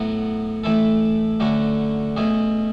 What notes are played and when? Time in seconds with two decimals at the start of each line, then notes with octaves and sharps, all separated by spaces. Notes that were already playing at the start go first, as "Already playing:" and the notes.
Already playing: A2 F#3 B3
0.64 A2 E3 A3 E4 A4
1.40 D3 F#3 A3 C#4 F#4
2.17 B2 A3 C#4 G#4